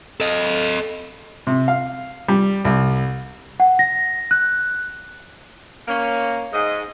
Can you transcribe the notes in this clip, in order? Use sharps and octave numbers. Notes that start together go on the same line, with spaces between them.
A4 D#5
C3
F5
G3
C2
F#5
A#6
F#6
A#3 C#4
G#2 D#5